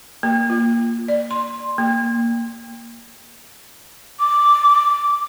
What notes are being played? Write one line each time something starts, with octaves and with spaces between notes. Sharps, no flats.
A#3
F4
D5
C6
A#3
D6